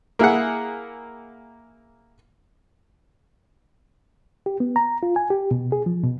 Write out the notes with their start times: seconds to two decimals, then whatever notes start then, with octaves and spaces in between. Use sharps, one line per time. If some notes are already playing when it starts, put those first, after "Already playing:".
0.19 A#3 E4 G#4 F#5
4.46 G4
4.60 B3
4.76 A#5
5.03 F4
5.16 G#5
5.30 G4
5.51 B2
5.72 G#4
5.86 F3
6.03 B2